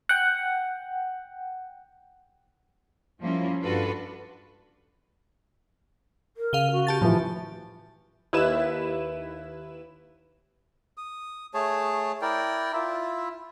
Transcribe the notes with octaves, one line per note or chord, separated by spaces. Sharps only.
F#5 G5
F3 G3 A#3 C#4 E4 F4
G2 D4 F4 F#4 A4 B4
A#4
C#3 F5 D#7 G7
F#4
G4 A5 A6
A2 E3 F3
D#2 E4 B4 E7
D#6
A3 G#4 C#5 A5
E4 A#4 D5 G5
E4 F4 E5